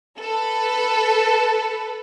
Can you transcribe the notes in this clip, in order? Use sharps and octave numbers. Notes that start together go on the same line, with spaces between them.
A4 B4